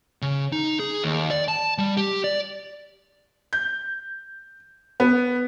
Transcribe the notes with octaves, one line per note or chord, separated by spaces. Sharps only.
C#3
D#4
G#4
D#2
D5
A5
G3
G4
D5
G6
B3